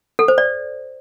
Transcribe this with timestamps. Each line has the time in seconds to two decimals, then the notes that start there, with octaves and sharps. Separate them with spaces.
0.19 A4
0.28 C5
0.38 D5